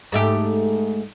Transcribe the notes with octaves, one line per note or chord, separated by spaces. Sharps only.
G#2 A3 G4